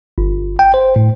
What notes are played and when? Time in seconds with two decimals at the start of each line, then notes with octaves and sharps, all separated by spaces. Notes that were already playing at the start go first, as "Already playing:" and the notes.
0.18 G1
0.59 G5
0.74 C5
0.96 A2